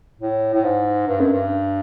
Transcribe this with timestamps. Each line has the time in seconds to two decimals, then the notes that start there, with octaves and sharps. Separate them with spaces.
0.20 A2
0.54 A2
0.64 G#2
1.07 G2
1.20 F#2
1.32 G2